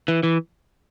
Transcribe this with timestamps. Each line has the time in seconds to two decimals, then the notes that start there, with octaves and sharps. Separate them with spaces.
0.08 E3
0.23 E3